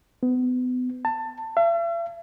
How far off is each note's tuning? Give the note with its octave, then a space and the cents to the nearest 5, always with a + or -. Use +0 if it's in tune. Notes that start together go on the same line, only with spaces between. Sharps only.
B3 +30
A5 +20
E5 +45